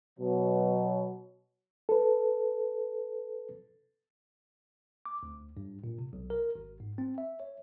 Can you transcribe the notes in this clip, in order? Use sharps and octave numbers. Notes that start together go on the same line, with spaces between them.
B2 F#3
A4 B4
D6
D2
G2
A#2
C3
B1
A#4
G#1
G#2
C4
E5
C#5